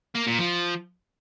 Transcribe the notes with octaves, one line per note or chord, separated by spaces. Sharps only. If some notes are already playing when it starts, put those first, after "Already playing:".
A#3
A#2
F3